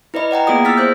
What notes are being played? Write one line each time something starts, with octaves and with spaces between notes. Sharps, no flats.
E4 B4 D5 D#5 B5
D5 F#5 G5 A#5
A#3 B3 F4 G#4 D5 D#6
E4 E6 F6 A6 B6
G#4 C5 F6 G6